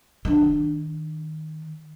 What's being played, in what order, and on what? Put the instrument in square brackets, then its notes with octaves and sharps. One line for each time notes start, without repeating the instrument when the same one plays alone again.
[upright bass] D#3 D4